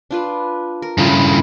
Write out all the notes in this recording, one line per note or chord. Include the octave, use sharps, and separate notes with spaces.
D4 F4 B4
A#4
G2 C#3 A3 E4 F4